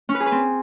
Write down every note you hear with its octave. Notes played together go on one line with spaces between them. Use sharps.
C#4
B4
G#4
B4
C4